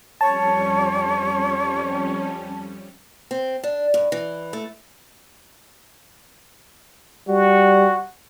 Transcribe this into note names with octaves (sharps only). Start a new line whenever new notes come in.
F2 G3 C#4 C#5 A5
C4
D4
G2
E3
A3
G3 F#4